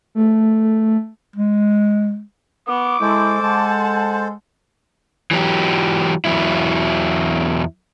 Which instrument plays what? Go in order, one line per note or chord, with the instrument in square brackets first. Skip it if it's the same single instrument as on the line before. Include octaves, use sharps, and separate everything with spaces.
[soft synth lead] A3
[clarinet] G#3
[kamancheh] B3 [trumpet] D6
[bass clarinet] G#3 [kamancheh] E4 [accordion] A4 C5
[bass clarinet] G#3 [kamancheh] F#5 A5
[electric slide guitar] E3 F#3 G4
E2 F#3 E4